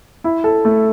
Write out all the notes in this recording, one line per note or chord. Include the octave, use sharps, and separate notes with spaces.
E4
A4
A3